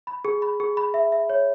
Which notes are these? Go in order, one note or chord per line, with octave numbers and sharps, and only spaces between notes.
B5
G#4
B5
G#4
B5
E5
E5
C#5